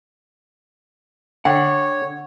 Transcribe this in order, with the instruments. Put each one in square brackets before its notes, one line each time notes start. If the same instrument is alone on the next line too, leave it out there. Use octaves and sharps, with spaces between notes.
[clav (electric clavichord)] D3 [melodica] C#5 [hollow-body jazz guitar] F#5 [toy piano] G5